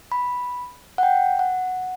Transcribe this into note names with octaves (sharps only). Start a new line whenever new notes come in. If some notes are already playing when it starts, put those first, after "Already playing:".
B5
F#5
G5
F#5